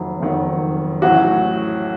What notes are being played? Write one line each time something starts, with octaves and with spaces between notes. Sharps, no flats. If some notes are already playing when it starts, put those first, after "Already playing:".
Already playing: F#1 F2 D#3 F#3
F#1 F2 D#3 F#3
A1 A2 F#3 F#4